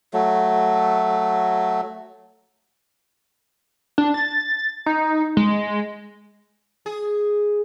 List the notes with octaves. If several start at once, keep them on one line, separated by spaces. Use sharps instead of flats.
F#3 A3
D4
A6
D#4
G#3
G#4